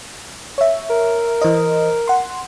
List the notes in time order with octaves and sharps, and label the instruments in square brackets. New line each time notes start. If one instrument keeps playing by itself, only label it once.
[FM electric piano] C#5 E5
[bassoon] A#4
[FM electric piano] E3 C5 D#5
F#5 C6